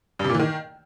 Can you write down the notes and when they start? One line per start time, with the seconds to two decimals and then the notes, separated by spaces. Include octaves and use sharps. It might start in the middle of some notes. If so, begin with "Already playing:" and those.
0.19 G2
0.24 C3
0.29 A#2
0.34 E3
0.40 D#3